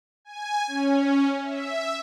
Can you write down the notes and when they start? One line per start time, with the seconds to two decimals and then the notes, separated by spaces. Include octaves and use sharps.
0.25 G#5
0.67 C#4
1.42 E5